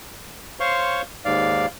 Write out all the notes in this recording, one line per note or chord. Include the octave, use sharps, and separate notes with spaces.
C5 C#5 F5 C6 C#6
D#2 G#2 D5 F5